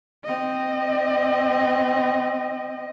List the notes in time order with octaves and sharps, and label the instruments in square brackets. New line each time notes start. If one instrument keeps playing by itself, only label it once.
[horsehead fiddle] C4 D#5